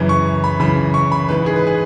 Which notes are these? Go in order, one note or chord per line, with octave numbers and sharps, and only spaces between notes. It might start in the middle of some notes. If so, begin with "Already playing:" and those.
Already playing: F#2 C#3 E3
C#6
B5
F#2 C#3 E3 B5
C#6
B5
G#2 E3 B4
G#4
B4
G#4